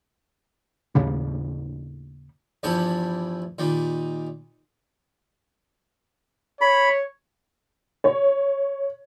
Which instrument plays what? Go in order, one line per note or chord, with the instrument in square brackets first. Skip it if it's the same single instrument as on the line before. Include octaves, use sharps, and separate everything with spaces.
[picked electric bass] D#2 A2 C#3 G3
[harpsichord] E2 G2 F3 G3 E4 A5
A#2 D#3 G3
[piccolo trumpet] C#5 [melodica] B5
[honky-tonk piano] C#5